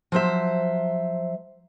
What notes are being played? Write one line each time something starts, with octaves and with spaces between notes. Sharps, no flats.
F3 F#3 C5 E5